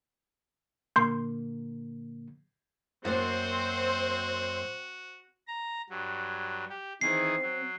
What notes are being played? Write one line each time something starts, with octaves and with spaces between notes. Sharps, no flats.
A#2 D3 A#3 C6 G6
F#2 A#3 C4 F#4 C5
A#5
G2 F#3
G4
D#3 E3 C4 G#4 C7
F#3